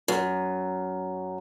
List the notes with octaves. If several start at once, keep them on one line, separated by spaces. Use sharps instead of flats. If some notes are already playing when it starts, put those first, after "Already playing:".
F#2